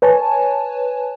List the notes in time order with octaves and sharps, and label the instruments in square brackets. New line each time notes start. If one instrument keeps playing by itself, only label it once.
[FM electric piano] B4 C#5 G#5 A5